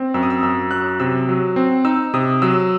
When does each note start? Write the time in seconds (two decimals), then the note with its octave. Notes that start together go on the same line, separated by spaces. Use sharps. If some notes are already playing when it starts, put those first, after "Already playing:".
Already playing: C4
0.14 F#2 E6
0.23 D#6
0.30 E6
0.43 F#2 E6
0.71 F#3 F#6
1.00 C3 E6
1.29 F#3
1.56 C4
1.85 D#4 E6
2.14 C3 D#6
2.42 F#3 E6